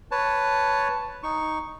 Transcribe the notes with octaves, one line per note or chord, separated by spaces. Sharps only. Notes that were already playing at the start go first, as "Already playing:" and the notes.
B4 C#5 A5
D#4 C#6